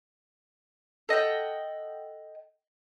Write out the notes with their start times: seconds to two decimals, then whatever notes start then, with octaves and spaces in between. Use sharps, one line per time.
1.09 A4 D#5 F#5 G5